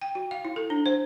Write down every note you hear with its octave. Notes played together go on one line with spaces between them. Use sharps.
G5
F#4
F5
E4
A4
D4
C5